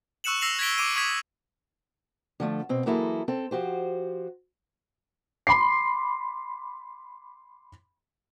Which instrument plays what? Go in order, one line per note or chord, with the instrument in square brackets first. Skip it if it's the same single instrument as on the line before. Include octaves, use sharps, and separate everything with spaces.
[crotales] C#6 E6 F#6 C#7 E7 F#7
E6 A#6 C7 F7 F#7
G#6 A#6 B6 D7 G7
C#6 D6 D7 D#7
C#6 D#6 G#6 B6
[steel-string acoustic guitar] D3 F3 A3
B2 C4
E3 F#3 A#3 E4 G#4 A4
C4 A4
F3 F#4 G4 C5
[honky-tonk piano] B5 C6 D6 C7